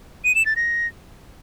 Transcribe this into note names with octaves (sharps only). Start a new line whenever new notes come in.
D#7
E7
A6
A#6